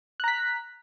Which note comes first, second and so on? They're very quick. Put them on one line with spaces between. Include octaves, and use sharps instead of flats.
F#6 A#5 B6